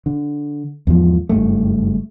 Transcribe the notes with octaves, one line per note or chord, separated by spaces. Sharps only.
D3
E2 G#2 F3
F#1 G2 A3